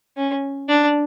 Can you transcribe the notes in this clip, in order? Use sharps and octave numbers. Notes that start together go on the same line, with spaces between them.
C#4
D4